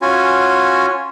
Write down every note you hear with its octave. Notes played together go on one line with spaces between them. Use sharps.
C#4 F4 F#4 G#5